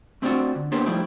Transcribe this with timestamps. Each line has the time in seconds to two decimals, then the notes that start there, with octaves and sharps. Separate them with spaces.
0.22 A3 C4 D4 D#4 F4 F#4
0.55 D3
0.72 A#3 B3 D4 G4 C5
0.86 F3 G3 A3 D#4 E4 G4